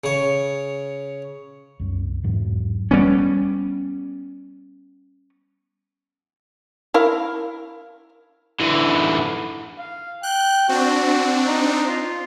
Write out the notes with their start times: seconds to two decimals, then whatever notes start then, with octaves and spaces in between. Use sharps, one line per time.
0.04 C#3 C#5
1.80 C2 F#2
2.23 E2 G#2 F#3
2.91 G3 B3 C#4
6.94 E4 A#4 F5
8.60 D3 E3
9.79 F5
10.23 G5 F#6
10.69 C4 D4 F#4
11.47 D#4
11.88 F4